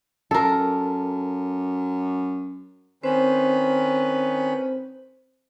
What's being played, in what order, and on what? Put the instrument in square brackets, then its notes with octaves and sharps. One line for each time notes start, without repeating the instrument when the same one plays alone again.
[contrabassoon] F#2 [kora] A4 A#4
[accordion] D#3 C#4 B4 [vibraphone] C4 C5